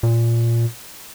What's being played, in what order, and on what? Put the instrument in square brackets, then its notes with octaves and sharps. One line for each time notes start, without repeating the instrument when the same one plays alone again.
[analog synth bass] A#2